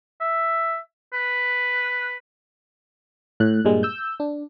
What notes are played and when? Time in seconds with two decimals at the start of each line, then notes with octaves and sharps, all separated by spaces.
0.21 E5
1.13 B4
3.40 A2 F#6
3.65 G2 A#2 G3 G#3
3.83 E6 G6
4.20 D4